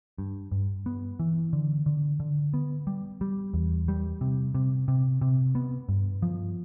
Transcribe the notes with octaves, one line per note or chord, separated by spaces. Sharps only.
G2
G2
B3
E3
D3
D3
D3
B3
G3
G3
E2
G3
C3
C3
C3
C3
B3
G2
F3